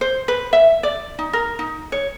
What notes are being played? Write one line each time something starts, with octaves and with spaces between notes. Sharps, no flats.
C5
B4
E5
D5
D#4
A#4
D#4
C#5